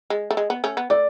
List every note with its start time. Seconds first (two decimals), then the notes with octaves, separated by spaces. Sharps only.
0.10 G#3
0.31 A3
0.37 G#3
0.50 B3
0.64 A3 C#4
0.77 B3
0.90 A3 D5